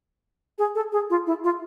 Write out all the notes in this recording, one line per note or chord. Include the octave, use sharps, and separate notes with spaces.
G#4
A4
G#4
F4
E4
F4